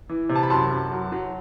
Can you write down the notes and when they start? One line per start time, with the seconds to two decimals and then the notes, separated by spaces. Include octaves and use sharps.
0.09 E3
0.29 C3
0.35 A5
0.43 B5
0.50 F#2 A5 C6
0.70 F#2
0.92 F#3
1.12 F#3